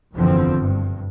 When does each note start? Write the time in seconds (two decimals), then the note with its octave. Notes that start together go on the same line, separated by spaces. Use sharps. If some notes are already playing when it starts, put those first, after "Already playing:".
0.13 F#1 E2 B2 D3 F3 C4
0.57 G2